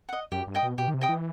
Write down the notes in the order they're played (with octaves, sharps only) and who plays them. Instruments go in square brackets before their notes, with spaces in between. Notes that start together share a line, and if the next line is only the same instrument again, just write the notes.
[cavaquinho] D#5 F#5
[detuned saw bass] F#2 [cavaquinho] G4
[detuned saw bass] G2
[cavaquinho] D#5 G5 D#6
[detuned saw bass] B2
[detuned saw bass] B2 [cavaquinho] G4
[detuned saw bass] D#3
C3
[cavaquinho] D#5 G5 D#6
[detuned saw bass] E3